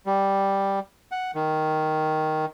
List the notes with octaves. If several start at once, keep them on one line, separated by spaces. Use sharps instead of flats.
G3
F#5
D#3